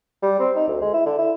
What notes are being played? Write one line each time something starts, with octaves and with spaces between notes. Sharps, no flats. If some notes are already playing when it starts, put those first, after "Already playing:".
G3
C4
D#4
D2
G#3
E4
D3
E4